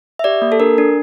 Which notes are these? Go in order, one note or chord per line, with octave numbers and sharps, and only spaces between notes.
E5
G4 D5
A#3
A4
D4 A#4
D4